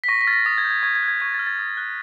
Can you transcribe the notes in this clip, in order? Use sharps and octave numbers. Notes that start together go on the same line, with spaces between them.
B6
C#6 A#6
B6
F6 A6
A#6
D#6 A6
G#6
G6
G#6
C#6 G#6
G#6
F#6
G#6
C#6 G#6
A6
F6
A6
D#6
F#6